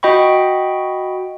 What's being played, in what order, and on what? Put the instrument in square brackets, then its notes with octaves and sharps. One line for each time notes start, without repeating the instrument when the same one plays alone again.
[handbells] F#4 D#5 G5 B5 C#6